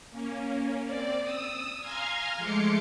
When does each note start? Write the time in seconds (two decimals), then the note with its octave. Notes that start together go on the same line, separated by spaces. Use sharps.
0.11 A#3 C#4
0.84 C4 D5
1.22 D#6 E6
1.80 F5 G#5 A#5 C6 F6 G#6
2.37 F3 G#3 A3 C6 D6 C#7